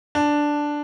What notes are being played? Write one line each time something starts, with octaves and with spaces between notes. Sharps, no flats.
D4